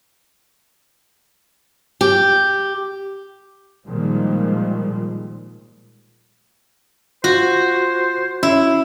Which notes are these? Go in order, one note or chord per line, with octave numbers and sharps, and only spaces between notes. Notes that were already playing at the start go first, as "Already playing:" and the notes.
G4
A#2 D#3 F3 G3 G#3
F4 F#4 C5
C#4 E4